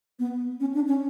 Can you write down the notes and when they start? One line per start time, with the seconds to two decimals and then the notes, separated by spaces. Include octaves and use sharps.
0.19 B3
0.60 C#4
0.74 D4
0.88 C#4